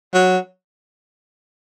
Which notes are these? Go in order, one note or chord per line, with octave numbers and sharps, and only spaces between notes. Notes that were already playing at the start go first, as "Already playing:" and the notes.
F#3